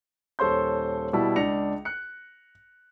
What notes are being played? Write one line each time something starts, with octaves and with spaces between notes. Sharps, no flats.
D#1 A4 C5 C#5 C6 G6
B2 G3 E4 A5
C#2 D4 A#6 C#7 F7
F#6 C#7